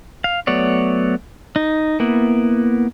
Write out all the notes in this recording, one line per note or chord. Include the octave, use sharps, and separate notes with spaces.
F5
F#3 A3 B3 C#5 D5
D#4
A#3 B3 E4